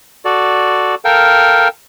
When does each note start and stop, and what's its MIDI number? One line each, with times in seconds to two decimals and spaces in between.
0.25 0.95 66
0.25 0.95 69
0.25 0.95 74
1.05 1.68 69
1.05 1.68 70
1.05 1.68 77
1.05 1.68 79